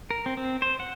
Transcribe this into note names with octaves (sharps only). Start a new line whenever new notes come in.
A#4
C4
C4
C5
F#5